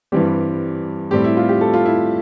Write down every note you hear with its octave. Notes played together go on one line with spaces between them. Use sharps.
G2 E3 G3 C4 G4
A2 G3 C4 G4
E4
F4
G4
A4
F4
E4